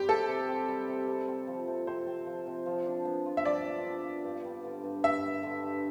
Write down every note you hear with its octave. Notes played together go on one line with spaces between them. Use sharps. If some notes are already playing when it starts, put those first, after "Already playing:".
Already playing: G3 C4 G4
C3 A4
C3
C4
G3
C3
C3
C4
F3
C3
C3 C5
C4
F3
C3
F3
D4
B3
F4
E5
F3 D5
D4
B3
F4
G2
G3
D3
G2
G2 E5
G3
D3
G2